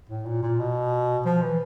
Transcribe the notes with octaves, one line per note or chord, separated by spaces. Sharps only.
A2
A#2
A#2
B2
F3
E3